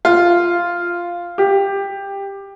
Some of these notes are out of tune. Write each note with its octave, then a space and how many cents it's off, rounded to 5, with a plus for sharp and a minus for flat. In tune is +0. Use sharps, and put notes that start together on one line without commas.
F4 -5
G4 +10